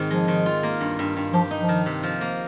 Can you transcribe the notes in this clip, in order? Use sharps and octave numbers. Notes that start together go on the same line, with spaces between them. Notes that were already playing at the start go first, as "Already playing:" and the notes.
Already playing: G#2 D#3 C4
F3 G#3
D#3
F4
A#3
G2
G2
G2
F3 G4
D#4
F3
D#3
C3
F3
A#3